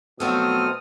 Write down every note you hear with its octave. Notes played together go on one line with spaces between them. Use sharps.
B2 F3 F#3 A3 C4 A4 D#6 F6